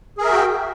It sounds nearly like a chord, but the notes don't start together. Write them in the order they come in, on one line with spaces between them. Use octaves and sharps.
G#4 A#4 E5 F#4 G5